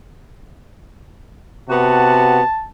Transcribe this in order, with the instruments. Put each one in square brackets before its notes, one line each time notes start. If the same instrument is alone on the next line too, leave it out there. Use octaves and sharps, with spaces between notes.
[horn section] C3 B3 F#4 [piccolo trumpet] A5